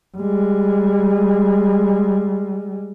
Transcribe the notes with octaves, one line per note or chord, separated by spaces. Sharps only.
G3 G#3